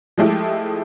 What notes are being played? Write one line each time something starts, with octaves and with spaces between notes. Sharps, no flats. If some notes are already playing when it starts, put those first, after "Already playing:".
F3 G#3 A3 E4 G4